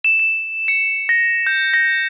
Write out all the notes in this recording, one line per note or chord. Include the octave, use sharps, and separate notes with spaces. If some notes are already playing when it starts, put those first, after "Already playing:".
E7
E7
C#7
A#6
G6
A#6